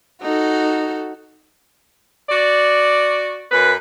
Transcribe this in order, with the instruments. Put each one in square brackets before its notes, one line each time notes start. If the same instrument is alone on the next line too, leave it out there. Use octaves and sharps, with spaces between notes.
[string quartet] D#4 F#4 A4
[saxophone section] F#4 D5
F#2 B4